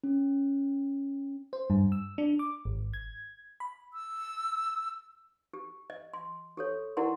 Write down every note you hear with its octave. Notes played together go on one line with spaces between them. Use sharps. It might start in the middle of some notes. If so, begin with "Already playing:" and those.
C#4
C5
G2
E6
D4
D6
G#1
G#6
B5
E6
G4
D#5
C6
G4 A4 C#5
E4 G4 A#4 D5 F#5 C6